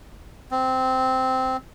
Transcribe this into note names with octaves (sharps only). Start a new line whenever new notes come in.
C4